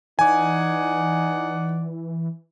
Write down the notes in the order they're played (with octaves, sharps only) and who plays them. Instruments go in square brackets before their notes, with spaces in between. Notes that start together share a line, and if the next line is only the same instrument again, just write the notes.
[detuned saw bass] E3 [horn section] D#4 D5 F#5 [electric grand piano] G#5